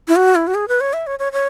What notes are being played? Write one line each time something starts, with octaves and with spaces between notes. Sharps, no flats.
E4
F#4
E4
F#4
G#4
B4
C#5
E5
C#5
C#5
C#5